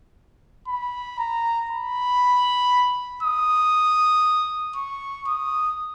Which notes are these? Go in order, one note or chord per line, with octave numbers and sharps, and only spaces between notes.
B5
A#5
B5
D#6
C#6
D#6